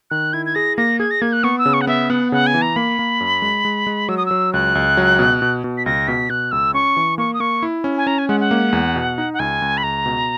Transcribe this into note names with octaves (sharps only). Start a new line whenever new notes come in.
D#3 F#6
E4 G#6
G#6
G#4 A#6
A#3 A#6
G#4 G#6
A#6
A#3 G#6
F#6
B3 C#6
E6
C#3
C#6
F#5
B3 E5
B3 F#5
C#3 F#5
G#5
E3
A#5
A#3 B5
A#3
F#2
G#3
G#3
G#3
F#3 E6
D#6
F#3 E6
C#2 F#6
C#2
F#3
B2
B2
B2
B6
C#2 A#6
B2 B6
B2 F#6
C#2 E6
C#4 C#6
E3
A#3 C#6
D#6
A#3 C#6
E4
C#4
G#5
C#4 A#5
G#5
G#3 F#5
F#5
A#3
E2
B2
D#4
F#5
C#2 G#5
C#2
B5
C#2 A#5
B2